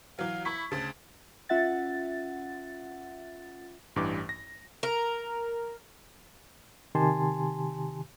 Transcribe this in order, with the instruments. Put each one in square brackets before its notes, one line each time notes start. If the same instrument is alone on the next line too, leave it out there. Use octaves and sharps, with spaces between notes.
[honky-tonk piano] E3 F#3 [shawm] F5
[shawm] E4 [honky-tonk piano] B5 C#6 B6
[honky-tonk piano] D2 C#3 [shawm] A5
[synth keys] C#4 F4 E5 F#5 A6
[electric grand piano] A1 G2 E3 G4 D6
A#6
[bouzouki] A#4
[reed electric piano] C3 D#3 G4 G#5 A5 C6